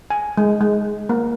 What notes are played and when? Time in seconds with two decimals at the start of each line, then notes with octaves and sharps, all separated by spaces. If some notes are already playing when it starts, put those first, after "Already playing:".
0.10 G#5
0.38 G#3
0.61 G#3
1.09 A#3